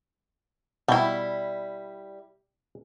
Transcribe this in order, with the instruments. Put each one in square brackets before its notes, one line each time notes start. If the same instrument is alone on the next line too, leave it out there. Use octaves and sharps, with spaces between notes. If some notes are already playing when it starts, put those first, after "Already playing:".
[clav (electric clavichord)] B2 [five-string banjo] G3 E4